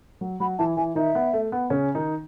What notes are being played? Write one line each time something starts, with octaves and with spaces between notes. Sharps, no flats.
F#3 F#4
F#3 F#4 B5
E3 E4 A5
E3 E4 G#5
D#3 D#4 E5
B3
A3
B3
C#3 C#4
D#3 D#4